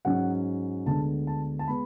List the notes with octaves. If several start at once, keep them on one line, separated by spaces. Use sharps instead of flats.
G#2 F#3 C#4 F#5
D2 D3 G#3 B3 D4 A5
A5
A5
G#3 B3 B5